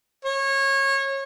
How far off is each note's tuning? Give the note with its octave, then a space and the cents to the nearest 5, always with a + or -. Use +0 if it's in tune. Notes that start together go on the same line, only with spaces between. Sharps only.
C#5 -25